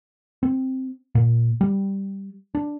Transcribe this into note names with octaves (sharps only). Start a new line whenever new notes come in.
C4
A#2
G3
D4